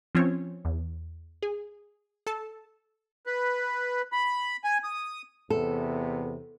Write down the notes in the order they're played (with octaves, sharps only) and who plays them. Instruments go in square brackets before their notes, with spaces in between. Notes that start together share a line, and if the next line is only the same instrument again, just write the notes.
[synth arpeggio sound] F3 C4 C#4 F4 C#5
E2
G#4
A4 A5
[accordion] B4
B5
G#5
D#6
[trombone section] E2 C3 B3 [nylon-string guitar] A4